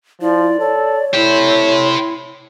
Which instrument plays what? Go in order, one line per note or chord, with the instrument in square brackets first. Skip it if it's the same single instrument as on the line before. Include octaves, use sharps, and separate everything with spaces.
[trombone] F3 [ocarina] E4 [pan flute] D5
[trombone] A4 [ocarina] C#5
[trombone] A3 [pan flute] E4 [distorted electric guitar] G4 C5